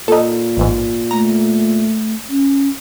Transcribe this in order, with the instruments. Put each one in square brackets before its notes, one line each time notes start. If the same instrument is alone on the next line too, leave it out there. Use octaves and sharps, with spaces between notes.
[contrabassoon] A#2 [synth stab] D#4 A4
[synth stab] A1 E2 G#2
[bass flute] A3 [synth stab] A#5
[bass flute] C#4